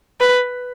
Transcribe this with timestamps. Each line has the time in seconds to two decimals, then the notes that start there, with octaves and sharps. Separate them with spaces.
0.20 B4